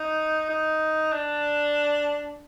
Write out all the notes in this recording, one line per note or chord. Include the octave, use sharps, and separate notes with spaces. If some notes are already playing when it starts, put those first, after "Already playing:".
Already playing: D#4
D#4
D4